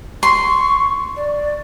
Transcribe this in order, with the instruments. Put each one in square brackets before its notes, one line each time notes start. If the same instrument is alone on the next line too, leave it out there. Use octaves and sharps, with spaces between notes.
[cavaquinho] C6 [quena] C#6
[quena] D5